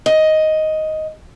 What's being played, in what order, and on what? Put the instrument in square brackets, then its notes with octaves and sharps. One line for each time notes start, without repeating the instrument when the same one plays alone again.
[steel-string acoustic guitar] D#5